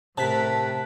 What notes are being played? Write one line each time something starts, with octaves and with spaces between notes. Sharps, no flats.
A2 C3 A#4 A5 B5 F#6 B6